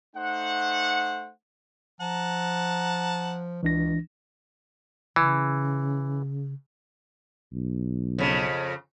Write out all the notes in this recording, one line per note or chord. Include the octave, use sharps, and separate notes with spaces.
A3 D#4 C5 F#5
F3 F#5 A5 A#5
C#2 E3 D4 A#6
C#3 E3
B1
F2 C#3